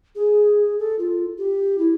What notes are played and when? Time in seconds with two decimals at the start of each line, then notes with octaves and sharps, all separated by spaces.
0.15 G#4
0.79 A4
0.99 F4
1.38 G4
1.78 E4